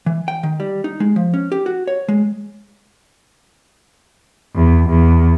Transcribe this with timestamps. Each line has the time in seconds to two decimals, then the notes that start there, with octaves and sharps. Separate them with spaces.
0.06 E3
0.28 G5
0.43 D#3
0.60 G3
0.84 D#4
1.00 G#3
1.16 F3
1.34 C#4
1.52 G4
1.66 F#4
1.87 C#5
2.09 G#3
4.54 E2
4.88 E2